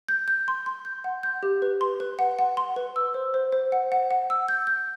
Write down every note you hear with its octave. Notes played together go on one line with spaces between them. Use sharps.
G6
G6
C6
C6
G6
F#5
G6
G4
B4
C6
B4
F#5
F#5
C6
B4
E6
C5
C5
C5
F#5
F#5
F#5
E6
G6
G6